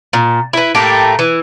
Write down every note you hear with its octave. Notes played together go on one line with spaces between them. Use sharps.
A#2
E4 B4
A2 A3 A#3 G4
E3